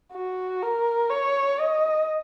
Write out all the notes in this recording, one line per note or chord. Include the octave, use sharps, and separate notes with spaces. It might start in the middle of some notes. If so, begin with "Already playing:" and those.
F#4
A#4
C#5
D#5